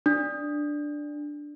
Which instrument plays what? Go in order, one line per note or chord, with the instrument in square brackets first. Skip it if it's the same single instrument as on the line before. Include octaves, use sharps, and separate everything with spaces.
[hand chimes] D4